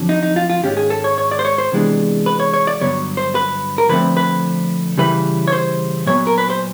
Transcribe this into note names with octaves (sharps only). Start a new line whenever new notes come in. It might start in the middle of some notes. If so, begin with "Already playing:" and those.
Already playing: F2 D3 F#3
D#4
D#4
F4
F4
G#2 D#3 G#3 C#4 G4
G#4
A4
C#5
C#5
D5
C5
C#5
C5
C3 E3 G#3 B3 D4
B4
C#5
C#5
D5
G2 D3 F#3 B3 C#5
C5
B4
A#4
D3 F3 A3 C4 B4
B4
C#3 E3 G3 B4
C#5
C5
A#2 F#3 B3 C#5
A#4
B4
C5